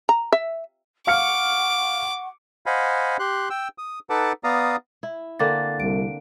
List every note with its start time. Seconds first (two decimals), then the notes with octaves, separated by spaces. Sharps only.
0.09 A#5
0.32 E5
1.07 F5 F#5 C#6 D6 F6 C#7
2.66 C5 D#5 F5 F#5 G#5 B5
3.19 G4 C6 F#6
3.50 G5 E6
3.78 D#6
4.10 D#4 A4 B4 F#5 A5 D6
4.44 B3 D5 F5 A#5 D#6
5.03 E4
5.39 D3 A#3 C4 A6
5.80 C2 D7